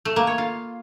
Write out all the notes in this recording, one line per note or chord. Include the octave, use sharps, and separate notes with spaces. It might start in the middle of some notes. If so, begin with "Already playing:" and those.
A3
A#3
C#5
F4